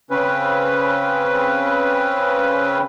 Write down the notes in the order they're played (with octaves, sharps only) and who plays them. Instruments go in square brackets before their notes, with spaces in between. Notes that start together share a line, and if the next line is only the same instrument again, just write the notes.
[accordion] C#3 C4 C#4 B4